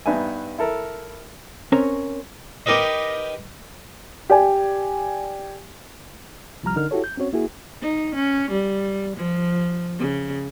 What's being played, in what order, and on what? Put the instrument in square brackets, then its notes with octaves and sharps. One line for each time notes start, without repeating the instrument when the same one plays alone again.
[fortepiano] G2 B3 D#4 E5 G#5
E4 A4 A#4
[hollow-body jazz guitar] C4 C#4 A#4 C#5 A#5
[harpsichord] D#4 G4 A#4 B4 D#5
[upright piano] G4 D5 G#5
[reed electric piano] C2 F3 G3 A#5 F6
D3 D#4 A#4 F6
E4 F#4 G4 A4 C#5
G6
C4 C#4 F#4 C#5
A#3 E4 F#4 G#4
[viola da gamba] D#4
C#4
G3
F3
C#3